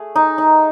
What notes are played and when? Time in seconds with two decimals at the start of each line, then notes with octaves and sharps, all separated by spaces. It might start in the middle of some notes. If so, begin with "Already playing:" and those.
Already playing: A3 G#4
0.16 D#4
0.38 D#4